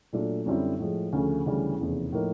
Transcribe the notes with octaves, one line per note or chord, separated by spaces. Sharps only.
A#2 F#3 A3 D4 F4
F#2 D3 G3 C4 E4
A2 F3 G#3
D2 C#3 F3 A3 C#4
D2 C#3 E3 G3
F1 E2 C#3
A2 F3 A#3 D#4